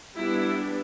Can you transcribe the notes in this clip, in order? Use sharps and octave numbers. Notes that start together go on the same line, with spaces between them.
G3 B3 D4 E4